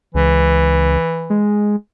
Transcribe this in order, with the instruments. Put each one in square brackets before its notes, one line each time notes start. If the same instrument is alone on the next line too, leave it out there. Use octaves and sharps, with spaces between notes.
[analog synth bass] C#2 [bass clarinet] E3
[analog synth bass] G#3